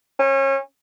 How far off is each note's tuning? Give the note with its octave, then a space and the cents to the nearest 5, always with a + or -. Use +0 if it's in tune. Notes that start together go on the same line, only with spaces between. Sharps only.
C#4 -30